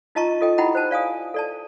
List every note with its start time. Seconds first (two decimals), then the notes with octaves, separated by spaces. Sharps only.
0.15 D#4 F4 D#5 A5 A#5 C#6
0.41 F4 A4 D#5 G5
0.58 D#4 E4 G4 F#5 G5 B5
0.75 C5 A5
0.91 D5 F5 G#5 D#6
1.34 A4 D5 A5